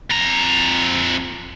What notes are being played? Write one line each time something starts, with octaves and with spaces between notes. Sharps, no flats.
F2 A#5